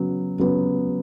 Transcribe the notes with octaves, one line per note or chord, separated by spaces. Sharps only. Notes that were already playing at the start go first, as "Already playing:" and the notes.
Already playing: C#3 F#3 B3
C#3 F#3 B3